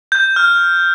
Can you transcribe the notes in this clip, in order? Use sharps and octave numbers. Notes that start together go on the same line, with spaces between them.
G6
F6